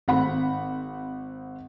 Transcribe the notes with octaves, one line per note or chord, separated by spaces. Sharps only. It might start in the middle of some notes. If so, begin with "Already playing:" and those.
G#1 C4 F#5 B5